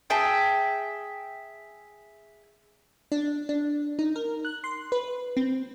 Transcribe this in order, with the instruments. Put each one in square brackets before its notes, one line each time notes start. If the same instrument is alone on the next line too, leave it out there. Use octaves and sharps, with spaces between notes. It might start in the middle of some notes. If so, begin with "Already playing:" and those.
[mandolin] G#4 E5 G5 A5
[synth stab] D4
D4
D#4
A#4
F#6
C6
B4
C4